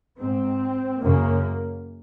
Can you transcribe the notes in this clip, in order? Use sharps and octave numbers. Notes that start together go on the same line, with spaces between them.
G#2 C4
F#2 C#3 A#3